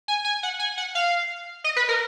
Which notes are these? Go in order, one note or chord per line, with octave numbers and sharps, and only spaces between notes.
G#5
G#5
F#5
G#5
F#5
F5
D#5
B4
A#4